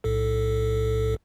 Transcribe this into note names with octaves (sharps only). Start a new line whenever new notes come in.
B1 A2 A4